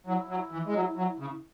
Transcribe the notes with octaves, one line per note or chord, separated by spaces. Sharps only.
F#3 E4
F#3
E3
G#3
F#3
F#3
C#3